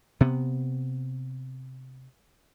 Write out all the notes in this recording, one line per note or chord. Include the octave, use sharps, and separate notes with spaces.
C3 B3